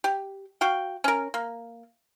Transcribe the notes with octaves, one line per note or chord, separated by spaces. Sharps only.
G4
F#4 F5 G5
C#4 A#4
A#3